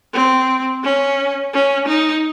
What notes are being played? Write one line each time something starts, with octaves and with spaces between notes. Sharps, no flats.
C4
C#4
C#4
D#4